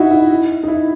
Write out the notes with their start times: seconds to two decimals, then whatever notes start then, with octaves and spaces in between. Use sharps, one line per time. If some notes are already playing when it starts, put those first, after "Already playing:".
Already playing: D#4 E4 F#4
0.11 E4
0.63 D#4
0.68 E4